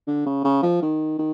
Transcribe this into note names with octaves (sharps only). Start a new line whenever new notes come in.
D3
C#3
C#3
F3
D#3
D#3